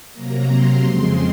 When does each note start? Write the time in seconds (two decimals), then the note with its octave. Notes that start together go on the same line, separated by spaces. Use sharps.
0.13 C3 F#3 A#3 A#5
0.49 C6
0.84 F2 C#3 G#3 C4